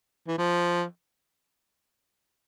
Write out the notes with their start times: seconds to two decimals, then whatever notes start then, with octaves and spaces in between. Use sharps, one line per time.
0.28 E3
0.38 F3